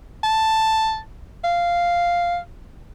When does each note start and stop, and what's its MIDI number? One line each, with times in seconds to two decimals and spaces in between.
0.24 0.98 81
1.44 2.38 77